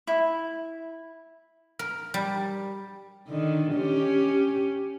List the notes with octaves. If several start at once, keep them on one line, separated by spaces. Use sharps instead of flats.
E4
A#4
G3
D3 D#3
C#4 G4